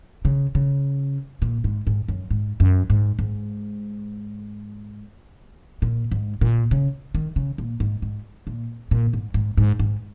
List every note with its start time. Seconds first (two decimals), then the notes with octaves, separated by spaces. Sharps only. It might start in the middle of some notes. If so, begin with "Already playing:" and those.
0.25 C#3
0.55 C#3
1.42 A#2
1.64 G#2
1.87 G#2
2.08 F#2
2.31 G#2
2.60 F#2
2.90 G#2
3.19 G#2
5.82 A#2
6.11 G#2
6.41 A#2
6.71 C#3
7.15 D#3
7.36 C#3
7.58 A#2
7.80 G#2
8.02 G#2
8.47 A#2
8.91 A#2
9.13 G#2
9.34 G#2
9.57 G#2
9.79 G#2